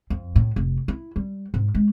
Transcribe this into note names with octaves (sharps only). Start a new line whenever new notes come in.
F2
A2
F1
E4
G3
G#2
G#3